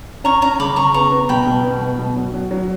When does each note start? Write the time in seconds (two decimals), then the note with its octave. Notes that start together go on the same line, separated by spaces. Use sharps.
0.24 C#4 A#5 C#6
0.42 C#4 A#5 C#6
0.59 C#3 B5 D6
0.76 C#3 A#5 C#6
0.94 B3 A#5 C#6
1.12 B3
1.29 B2 G5 B5
1.46 B2
1.64 B3
1.81 B2
1.99 B2
2.16 F#3
2.34 F#3
2.51 F#3